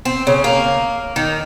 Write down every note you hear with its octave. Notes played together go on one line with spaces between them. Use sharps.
C4
C#3
A#3
D#3